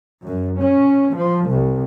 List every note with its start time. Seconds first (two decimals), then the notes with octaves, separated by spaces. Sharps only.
0.24 F#2
0.60 C#4
1.13 F3
1.46 C2